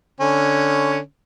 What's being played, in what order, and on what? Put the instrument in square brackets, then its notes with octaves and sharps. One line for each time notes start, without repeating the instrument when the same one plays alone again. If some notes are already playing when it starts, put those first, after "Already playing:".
[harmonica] D3 C#4